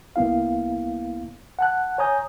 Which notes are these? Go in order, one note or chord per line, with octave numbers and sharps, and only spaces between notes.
C2 A#3 B3 E4 F5
F#5 A5 F#6
C#5 G#5 A#5 D#6 G6